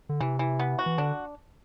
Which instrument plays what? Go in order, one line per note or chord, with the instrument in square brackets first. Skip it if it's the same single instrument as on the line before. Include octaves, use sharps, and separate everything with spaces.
[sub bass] D3
[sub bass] C3 [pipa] E3
[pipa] E3
B3
F#4
[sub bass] E3
[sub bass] D3 [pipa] D4